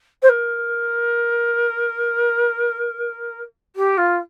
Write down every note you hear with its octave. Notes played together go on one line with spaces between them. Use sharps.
C5
A#4
G4
F4